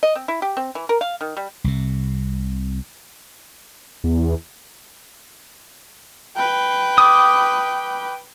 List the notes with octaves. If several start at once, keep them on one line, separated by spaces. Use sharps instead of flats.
D#5
C4
E4
G4
C4
E3
A#4
F5
D#3
G3
C2 C3
E2
B4 G5
D6 D#6